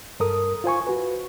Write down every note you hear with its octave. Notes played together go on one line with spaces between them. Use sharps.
G2 A4 A#4 D#6
F4 C5 G#5 C#6
F#4 B4